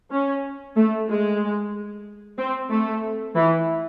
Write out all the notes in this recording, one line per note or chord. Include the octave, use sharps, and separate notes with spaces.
C#4
A3
G#3
C4
A3
E3